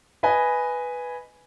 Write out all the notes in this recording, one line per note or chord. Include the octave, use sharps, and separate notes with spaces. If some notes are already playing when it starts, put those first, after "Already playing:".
B4 D#5 G#5 B5